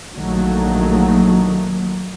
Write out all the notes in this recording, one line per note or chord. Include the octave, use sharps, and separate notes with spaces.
A#1 D#3 F#3 A3 A#3